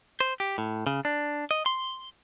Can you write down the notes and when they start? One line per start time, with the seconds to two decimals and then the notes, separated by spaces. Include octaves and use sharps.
0.21 C5
0.40 G4
0.58 A2
0.87 C#3
1.05 D4
1.51 D#5
1.66 C6